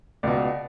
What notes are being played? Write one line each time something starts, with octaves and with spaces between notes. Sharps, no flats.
C#2 B2 D5